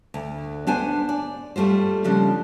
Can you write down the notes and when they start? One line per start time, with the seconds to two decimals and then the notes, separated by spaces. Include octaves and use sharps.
0.14 D2
0.67 B3 D4 C5 G#5
1.09 D5
1.56 G3 A3 F4 C5
2.04 C#3 F3 G3 A#3 D4